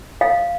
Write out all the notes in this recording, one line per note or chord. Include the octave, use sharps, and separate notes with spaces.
F5